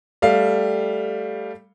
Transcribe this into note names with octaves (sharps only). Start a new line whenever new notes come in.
G3 A3 F5